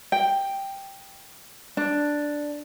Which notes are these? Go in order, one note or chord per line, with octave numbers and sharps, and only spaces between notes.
G5
D4